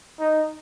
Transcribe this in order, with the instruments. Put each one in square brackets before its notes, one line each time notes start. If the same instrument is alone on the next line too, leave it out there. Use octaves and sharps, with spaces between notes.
[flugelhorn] D#4